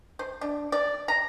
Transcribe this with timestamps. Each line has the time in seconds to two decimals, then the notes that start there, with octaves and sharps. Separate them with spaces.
0.19 C5
0.41 D4
0.72 D5
1.08 A#5